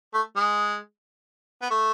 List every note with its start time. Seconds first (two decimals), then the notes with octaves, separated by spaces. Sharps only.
0.14 A3
0.36 G#3
1.62 B3
1.70 A3